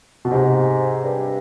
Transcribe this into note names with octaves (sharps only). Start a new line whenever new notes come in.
B2
G#2 C3
G2